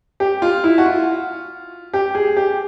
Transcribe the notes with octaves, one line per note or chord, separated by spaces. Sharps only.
G4
F4
E4
F#4
F4
G4
G#4
G4